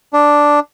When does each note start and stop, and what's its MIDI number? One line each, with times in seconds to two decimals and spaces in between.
0.13 0.60 62